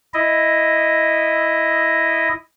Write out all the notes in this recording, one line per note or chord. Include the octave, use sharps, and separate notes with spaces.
E4 D#5